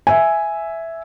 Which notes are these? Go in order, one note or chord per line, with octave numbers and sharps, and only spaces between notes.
E5 G#5